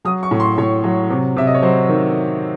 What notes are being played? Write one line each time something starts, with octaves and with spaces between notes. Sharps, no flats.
F#3 D#6
C#6
A2
C6
A2 C#5
F#3
C3
C3 E5
D#5
C#5
F#3 C5
D#3